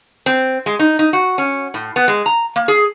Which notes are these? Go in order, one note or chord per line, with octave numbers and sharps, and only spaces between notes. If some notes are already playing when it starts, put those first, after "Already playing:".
C4
G#3
D#4
D#4
F#4
C#4
A2
B3
G#3
A#5
A#3
G#4